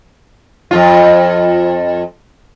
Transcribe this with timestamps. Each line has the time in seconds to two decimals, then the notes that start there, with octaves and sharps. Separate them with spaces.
0.71 F2 B2 F4